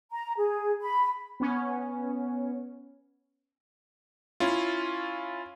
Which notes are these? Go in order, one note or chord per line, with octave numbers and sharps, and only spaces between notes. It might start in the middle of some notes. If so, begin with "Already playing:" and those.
A#5
G#4
B5
B3 C#4
C#4 E4 F4